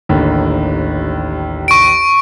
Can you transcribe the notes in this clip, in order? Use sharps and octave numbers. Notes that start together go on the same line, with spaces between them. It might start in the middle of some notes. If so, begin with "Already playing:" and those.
A1 D#2 D3
C#6 D7